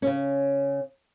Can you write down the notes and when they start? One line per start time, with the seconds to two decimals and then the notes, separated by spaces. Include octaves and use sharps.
0.02 C#3 C#4